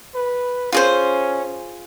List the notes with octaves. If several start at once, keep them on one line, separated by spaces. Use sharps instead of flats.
B4
C#4 F4 G#4 C5